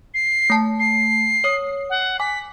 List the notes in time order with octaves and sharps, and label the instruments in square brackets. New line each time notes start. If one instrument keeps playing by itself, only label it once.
[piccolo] C7
[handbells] A3 A5
[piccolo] C7
[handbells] C#5 D#6
[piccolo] F#5
[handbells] G#5 D6 [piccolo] B6